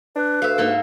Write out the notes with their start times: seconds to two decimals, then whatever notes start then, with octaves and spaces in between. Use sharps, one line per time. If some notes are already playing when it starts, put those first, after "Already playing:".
0.16 D4 B4
0.42 D2 E5 F5
0.58 G#2 A#3 A4